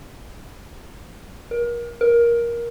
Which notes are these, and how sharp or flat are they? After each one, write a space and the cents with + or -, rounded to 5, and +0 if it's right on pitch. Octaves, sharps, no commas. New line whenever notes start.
A#4 +30
A#4 +15